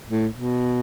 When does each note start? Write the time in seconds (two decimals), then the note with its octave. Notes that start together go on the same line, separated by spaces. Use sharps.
0.08 A2
0.34 B2